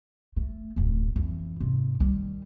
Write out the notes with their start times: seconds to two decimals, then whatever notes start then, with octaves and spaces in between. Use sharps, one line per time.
0.36 A3
0.76 D1 F2
1.16 F2 E3
1.60 G#2 C3
2.00 D#3 G3